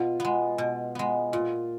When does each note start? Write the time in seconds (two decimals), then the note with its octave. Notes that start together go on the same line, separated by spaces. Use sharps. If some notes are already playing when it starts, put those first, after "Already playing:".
Already playing: B2 F4
0.20 G#3 B3
0.58 B2
0.95 G#3 B3
1.33 A#2 F4